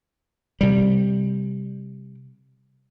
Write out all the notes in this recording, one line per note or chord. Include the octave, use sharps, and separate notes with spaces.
C3 G3